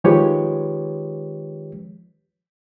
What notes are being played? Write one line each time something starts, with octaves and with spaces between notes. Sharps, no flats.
D#3 F3 G#3 G4 B4 C#5